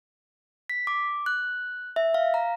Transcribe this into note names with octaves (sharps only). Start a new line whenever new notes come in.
B6
D6
F#6
E5
F5
A#5